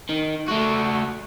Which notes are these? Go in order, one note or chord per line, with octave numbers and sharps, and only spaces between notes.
D#3
A3 F#4